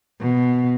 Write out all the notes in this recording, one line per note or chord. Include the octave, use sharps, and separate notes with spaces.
B2